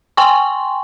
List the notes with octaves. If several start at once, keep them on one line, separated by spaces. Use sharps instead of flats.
G5 G#5 C6 C#6